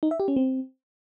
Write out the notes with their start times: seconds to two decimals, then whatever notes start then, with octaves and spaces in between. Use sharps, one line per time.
0.03 D#4
0.11 E5
0.20 G4
0.28 C#4
0.36 C4